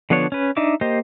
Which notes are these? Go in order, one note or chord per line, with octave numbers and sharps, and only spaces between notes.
D3 F3 B3 D4 C#5
C#4 B4
D4 D#4 D#5 E5 D6
A#3 G4 C5 D#5